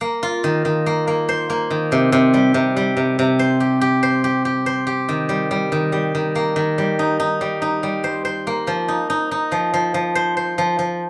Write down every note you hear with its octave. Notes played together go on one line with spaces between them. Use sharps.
A#3
F4
D#3
D#3
A#3
A#3
C5
A#3
D#3
C3
C3
G3
C3
G3
C3
C3
C5
G4
G4
C5
G4
G4
C5
G4
D#3
G3
G3
D#3
G3
D#3
A#3
D#3
G3
D#4
D#4
G3
D#4
G3
C5
C5
A#3
F3
D#4
D#4
D#4
F3
F3
F3
C5
C5
F3
F3